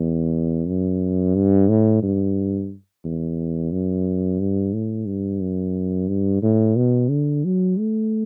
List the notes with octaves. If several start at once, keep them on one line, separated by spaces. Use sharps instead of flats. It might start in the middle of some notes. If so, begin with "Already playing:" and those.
Already playing: E2
F#2
G2
A2
G2
E2
F#2
G2
A2
G2
F#2
G2
A2
B2
D3
F#3
A3